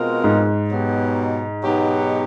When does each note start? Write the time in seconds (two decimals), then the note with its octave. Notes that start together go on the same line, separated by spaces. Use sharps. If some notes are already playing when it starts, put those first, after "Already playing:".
Already playing: B2 G#3 C4 F4 A#4
0.24 G#2
0.70 B2 F#3 B3 D#4 G4
1.64 B2 F#3 B3 D#4 G4